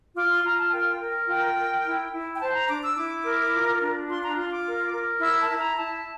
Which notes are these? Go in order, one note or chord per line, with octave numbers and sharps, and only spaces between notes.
F4 D6
C6
F4 A#5
A5
A#4 G5
A#4
F4 G5
A#4
E4
E4
G5
C5 A5
A#5
D4 D6
E6
E4 D6
A#4
F4
D4
F4 C6
A#5
F4 C6
D6
A#4
A#4
E4 E6
A5
E4
A#5
E4 A5